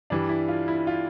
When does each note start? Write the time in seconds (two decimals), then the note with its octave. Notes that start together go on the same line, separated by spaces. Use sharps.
0.10 G2 E3 G3 D4
0.29 E4
0.48 F4
0.68 E4
0.87 F4